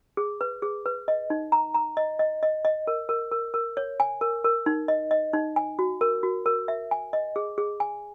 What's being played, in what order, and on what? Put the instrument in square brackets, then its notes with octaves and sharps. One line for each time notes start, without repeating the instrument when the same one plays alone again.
[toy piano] G#4
B4
G#4
B4
D#5
D#4
A#5
A#5
D#5
D#5
D#5
D#5
A#4
A#4
A#4
A#4
C#5
G#5
A#4
A#4
D#4
D#5
D#5
D#4
G#5
F#4
A#4
F#4
A#4
E5
G#5
D#5
G#4
G#4
G#5